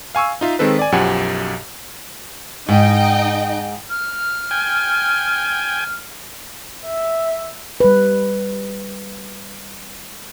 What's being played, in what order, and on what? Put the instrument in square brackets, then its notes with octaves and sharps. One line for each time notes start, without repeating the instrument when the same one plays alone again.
[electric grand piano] F5 G#5 C#6 E6
D#4 F4 E5
D#3 G#3 C4 A4 B4
D5 G#5
B1 F#2 F3 G4 F#5 G#5
[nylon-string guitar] G#2 [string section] D#4 D#5 G5
[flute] F6
[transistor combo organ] G5 G#5
[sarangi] E5
[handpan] G3 B4